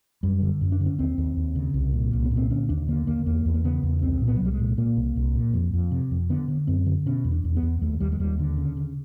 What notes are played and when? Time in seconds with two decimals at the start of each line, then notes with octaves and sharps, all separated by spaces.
0.23 F#2 G3
0.42 D3
0.61 F#2
0.72 D4
0.80 D3
0.86 C#4
0.99 D#2 C4
1.18 D#2
1.37 D#2
1.56 C#3
1.74 C2
1.93 A#2
2.11 C2 A#3
2.24 B3
2.31 A#2
2.37 C4
2.50 D3 C#4
2.69 D#2 D4
2.88 D3 A#3
3.07 D#2 A#3
3.26 E2 A#3
3.46 E2
3.54 A#3
3.64 C#3 B3
3.83 E2
4.02 C2 C4
4.22 A#2
4.28 B3
4.36 F#3
4.40 C2
4.45 G3
4.53 G#3
4.59 A#2
4.78 A#2 A#3
4.97 C2
5.16 C2
5.35 A#2
5.54 F2
5.73 F2
5.91 C3
6.11 F2
6.30 D3 B3
6.48 D3
6.67 F#2 C4
6.86 D3
7.06 B2 C#4
7.24 E2
7.32 D4
7.44 E2
7.56 B3
7.63 E2
7.82 D#2 A3
8.00 D#2 G3
8.12 G#3
8.20 D#2 G3
8.39 D3
8.57 C#3
8.77 C#3